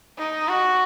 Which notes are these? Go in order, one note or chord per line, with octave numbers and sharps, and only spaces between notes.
D#4
F#4